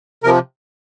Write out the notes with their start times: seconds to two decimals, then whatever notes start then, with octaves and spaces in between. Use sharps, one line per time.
0.23 C3 F3 A#4